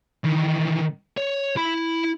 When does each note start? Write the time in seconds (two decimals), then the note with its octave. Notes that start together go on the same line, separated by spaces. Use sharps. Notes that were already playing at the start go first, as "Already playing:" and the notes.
0.24 D#3 E3
1.18 C#5
1.57 E4 B5